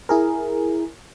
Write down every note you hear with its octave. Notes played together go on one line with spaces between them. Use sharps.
E4 G#4 A#4